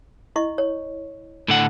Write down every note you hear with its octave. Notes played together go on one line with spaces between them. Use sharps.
E4 D#5 C#6
C#5
A2 D3 F#5